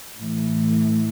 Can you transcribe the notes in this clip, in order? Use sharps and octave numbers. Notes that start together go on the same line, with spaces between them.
A2 E3